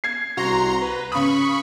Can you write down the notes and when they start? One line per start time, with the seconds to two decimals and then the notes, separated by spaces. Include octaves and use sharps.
0.04 G#6 C7
0.37 C2 F#4 A#5 C6
0.82 B4
1.12 C#3 B5 C#6 D#6